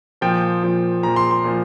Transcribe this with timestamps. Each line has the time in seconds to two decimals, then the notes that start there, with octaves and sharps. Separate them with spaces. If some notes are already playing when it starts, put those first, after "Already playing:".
0.21 A#2 F3 G5
0.63 A#2 F3
1.03 A#2 A#5
1.07 F3
1.16 C6
1.31 C6
1.44 A#2 F3